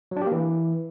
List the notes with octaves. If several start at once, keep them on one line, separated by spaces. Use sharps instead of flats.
F#3
D4
G4
A#3
E3